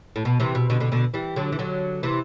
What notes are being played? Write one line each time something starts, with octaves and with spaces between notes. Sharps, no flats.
A2
B2
C3 E3
B2
B2 D3
B2 D3
B2 D3
E3 G3
D3 F#3
E3
D3 F#3
C3 E3